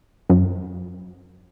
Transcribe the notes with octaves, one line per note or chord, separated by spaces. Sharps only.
F#2